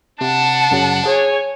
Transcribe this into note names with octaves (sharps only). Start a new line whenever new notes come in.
C3 D4 F#5 A5
F#2 C#3 F#3
G#4 C#5 G#5